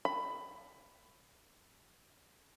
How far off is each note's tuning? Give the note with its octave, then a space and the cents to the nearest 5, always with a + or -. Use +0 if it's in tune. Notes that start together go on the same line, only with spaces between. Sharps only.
B5 +15